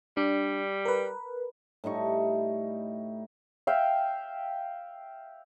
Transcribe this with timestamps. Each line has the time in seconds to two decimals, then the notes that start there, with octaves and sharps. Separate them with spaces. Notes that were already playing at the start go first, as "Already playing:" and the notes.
0.17 G3 D4
0.85 A#4 B4
1.84 A2 G3 D#4 C#6
3.67 E5 F5 G5